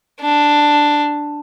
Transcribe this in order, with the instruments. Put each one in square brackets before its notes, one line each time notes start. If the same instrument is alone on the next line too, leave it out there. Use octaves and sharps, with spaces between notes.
[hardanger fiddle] D4